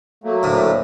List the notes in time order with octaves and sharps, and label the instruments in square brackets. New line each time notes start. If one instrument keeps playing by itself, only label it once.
[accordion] F#3 A3 A#3
[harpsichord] D2 A2